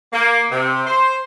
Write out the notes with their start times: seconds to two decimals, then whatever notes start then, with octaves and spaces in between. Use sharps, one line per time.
0.12 A#3
0.50 C3
0.86 C5